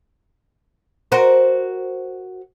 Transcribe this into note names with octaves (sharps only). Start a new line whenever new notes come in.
F#4 A#4 C5